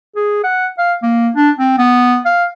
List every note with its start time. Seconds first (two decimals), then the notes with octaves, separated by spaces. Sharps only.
0.16 G#4
0.44 F#5
0.78 F5
1.02 A#3
1.36 D4
1.59 C4
1.78 B3
2.25 F5